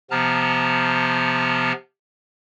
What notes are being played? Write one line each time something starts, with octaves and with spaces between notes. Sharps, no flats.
C3 F3 B3 A5 A#5 F6